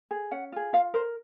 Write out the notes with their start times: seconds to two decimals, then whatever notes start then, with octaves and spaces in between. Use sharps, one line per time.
0.11 G#4
0.31 C#4 F#5
0.52 F4 G#4
0.73 F4 F5
0.94 A#4 C5